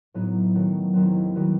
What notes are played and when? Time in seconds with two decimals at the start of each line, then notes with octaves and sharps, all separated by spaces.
0.14 A2 F#3 B3 D#4
0.55 D#3 F#3 A3
0.94 D#2 D#3 F#3 C4 E4
1.35 D#3 G3 B3 F#4